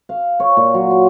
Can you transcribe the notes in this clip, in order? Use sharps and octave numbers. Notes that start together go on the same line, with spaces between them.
F5
C#5
A#2
F#3
C6